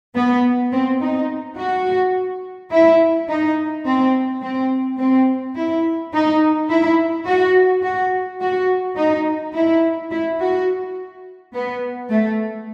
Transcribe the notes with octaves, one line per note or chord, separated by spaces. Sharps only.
B3
C4
D#4
F#4
E4
D#4
C4
C4
C4
E4
D#4
E4
F#4
F#4
F#4
D#4
E4
E4
F#4
B3
A3